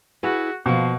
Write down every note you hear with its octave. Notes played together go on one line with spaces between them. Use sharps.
E4 F#4 G#4 B4
B2 F3 A#3 C5